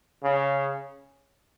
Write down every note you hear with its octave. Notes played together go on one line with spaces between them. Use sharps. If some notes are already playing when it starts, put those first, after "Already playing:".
C#3